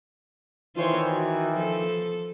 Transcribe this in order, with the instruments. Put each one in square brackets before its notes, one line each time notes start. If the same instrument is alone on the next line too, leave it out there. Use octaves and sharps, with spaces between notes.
[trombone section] D#3 E3 [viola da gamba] F4 C5 C#5
[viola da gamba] F#4
F3 A4